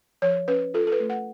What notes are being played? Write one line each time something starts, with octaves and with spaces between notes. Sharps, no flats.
F3 C#5
C#4 B4
F4 A4
A4
B4
A3
F#5